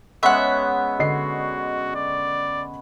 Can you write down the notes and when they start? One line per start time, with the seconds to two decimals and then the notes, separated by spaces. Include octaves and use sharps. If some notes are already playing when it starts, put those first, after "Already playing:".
0.23 G#3 B3 C#4 E5 F#5
0.99 D3 F#4 D#5 C7
1.95 D5